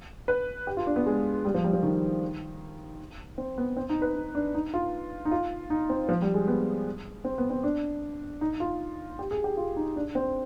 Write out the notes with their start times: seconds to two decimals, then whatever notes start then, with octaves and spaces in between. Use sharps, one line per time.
0.28 B4
0.67 G4
0.77 F4
0.87 D4
0.96 B3
1.06 G#3
1.45 G3
1.54 F3
1.64 G3
1.73 F3
1.83 D#3
3.38 C4
3.58 B3
3.77 C4
3.89 D#4
4.02 B4
4.15 D#4
4.35 D4
4.54 D#4
4.74 F4
5.25 D#4
5.31 F4
5.70 D#4
5.89 C4
6.09 F3
6.22 G3
6.34 G#3
6.48 B3
7.24 C4
7.38 B3
7.50 C4
7.64 D4
8.41 D#4
8.60 F4
9.19 G4
9.31 G#4
9.44 G4
9.57 F4
9.77 D#4
9.96 D4
10.15 C4